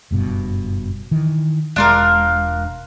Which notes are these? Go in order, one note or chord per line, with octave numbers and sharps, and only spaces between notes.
F#1 G2 B2
D#3 E3
E1 G#3 D4 F4 A#4